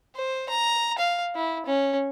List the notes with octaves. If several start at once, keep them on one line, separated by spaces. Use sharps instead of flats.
C5
A#5
F5
E4
C#4